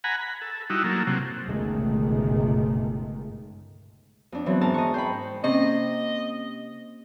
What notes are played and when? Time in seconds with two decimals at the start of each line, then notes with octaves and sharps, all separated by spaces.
0.04 F#5 G#5 A#5 B5
0.21 B5
0.42 A4
0.70 G3 D#4 E4 F#4
0.84 F#3 A#3 A4
1.07 C3 F#3
1.45 G1 C#2 B2 D#3 G#3 A3
4.32 F2 D4
4.46 E3 F#3 B3 C4
4.61 G#2 E3 A#4 A5
4.74 D#5 C#6
4.94 C5 G5 B5
5.44 C3 A#3 C4 C#4 D#5